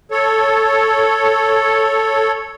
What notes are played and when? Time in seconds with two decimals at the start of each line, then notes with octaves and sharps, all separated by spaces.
0.11 A4 C#5